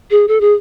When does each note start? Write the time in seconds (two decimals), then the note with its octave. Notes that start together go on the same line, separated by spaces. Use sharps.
0.11 G#4
0.28 A4
0.41 G#4